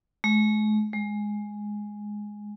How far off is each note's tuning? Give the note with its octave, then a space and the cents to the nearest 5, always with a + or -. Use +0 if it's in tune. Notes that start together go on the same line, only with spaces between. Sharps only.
G#3 +45
G#3 +0